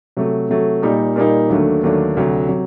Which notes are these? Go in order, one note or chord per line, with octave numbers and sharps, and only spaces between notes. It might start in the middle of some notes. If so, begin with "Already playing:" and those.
C3 F#3 A3
C3 F#3 A3
A#2 G3 A#3 D#4
A#2 G3 A#3 D#4
D#2 D3 F#3 A3 D4
D#2 D3 F#3 A3 D4
D2 C3 F#3
C3 F#3